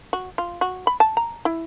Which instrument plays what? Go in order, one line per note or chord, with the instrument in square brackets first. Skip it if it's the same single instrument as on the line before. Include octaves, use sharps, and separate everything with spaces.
[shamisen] F#4
F4
F#4
B5
A5
A#5
E4